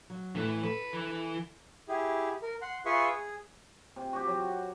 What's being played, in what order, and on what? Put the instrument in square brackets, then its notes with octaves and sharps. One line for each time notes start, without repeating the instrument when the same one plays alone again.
[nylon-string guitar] F#3
[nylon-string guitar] A2 A4 [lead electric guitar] E3
[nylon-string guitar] A4 [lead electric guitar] B4
[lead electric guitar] E3
[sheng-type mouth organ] E4 G4 G#4
A#4
F#5 C6
F4 G#4 B4 E5 C6 C#6
G#4
[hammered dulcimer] C3
F#4 G4
F#3